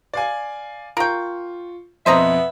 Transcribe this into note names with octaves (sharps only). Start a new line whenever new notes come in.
D5 F5 G#5
F4 A#4 G5 C#6
F2 B2 B3 C5 D#5 E5 A#5